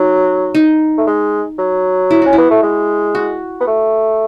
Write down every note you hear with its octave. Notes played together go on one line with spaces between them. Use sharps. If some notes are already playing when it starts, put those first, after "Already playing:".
Already playing: F#3 D#4
D#4
A3
G#3
F#3
E4
C#4 F#4
E4
B3
A3
G#3
F#4
B3
A3